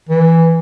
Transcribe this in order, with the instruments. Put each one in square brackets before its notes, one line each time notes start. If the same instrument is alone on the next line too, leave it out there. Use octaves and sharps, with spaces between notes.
[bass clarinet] E3